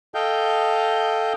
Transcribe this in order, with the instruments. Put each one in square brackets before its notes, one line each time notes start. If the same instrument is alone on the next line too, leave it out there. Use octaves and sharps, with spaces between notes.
[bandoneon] A4 D#5 F5 G5 G6